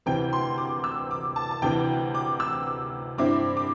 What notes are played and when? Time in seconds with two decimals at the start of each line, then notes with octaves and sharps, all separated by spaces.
0.06 D2 C3 E3 C4 G5
0.33 C6
0.58 D6
0.84 E6
1.11 D6
1.36 A5
1.51 A5
1.62 D2 C3 E3 G5
2.15 D6
2.40 E6
3.18 G2 D3 C4 E4 D6
3.57 D6